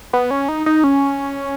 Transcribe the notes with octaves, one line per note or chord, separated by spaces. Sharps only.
B3
C#4
D#4
D#4
C#4